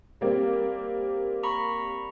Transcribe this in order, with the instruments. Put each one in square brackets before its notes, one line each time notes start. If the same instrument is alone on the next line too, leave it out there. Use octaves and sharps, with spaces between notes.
[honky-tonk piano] G3 A#3 C4
[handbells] A#5 B5 C#6